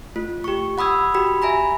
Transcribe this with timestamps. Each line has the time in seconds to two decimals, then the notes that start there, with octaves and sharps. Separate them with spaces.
0.16 A3 F4
0.44 G4 C#6
0.78 F#5 B5 D#6 E6 G#6
1.14 F#4 G4 B5
1.42 E5 G#5 A#5 B5